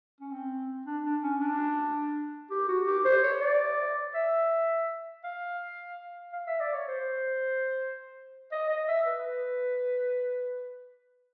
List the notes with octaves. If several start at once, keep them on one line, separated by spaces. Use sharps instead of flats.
C#4
C4
D4
D4
C#4
D4
G4
F#4
G4
C5
C#5
D5
E5
F5
F5
E5
D5
C#5
C5
D#5
D#5
E5
B4